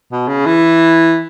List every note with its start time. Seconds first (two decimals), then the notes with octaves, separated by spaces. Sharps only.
0.12 B2
0.28 C#3
0.46 E3